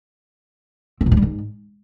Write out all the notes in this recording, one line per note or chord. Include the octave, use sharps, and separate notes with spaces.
C4
A#2
F3
G3
G#2